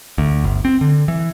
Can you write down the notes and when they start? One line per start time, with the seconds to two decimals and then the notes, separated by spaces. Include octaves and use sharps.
0.18 D2
0.44 G1
0.65 C4
0.81 D3
1.08 E3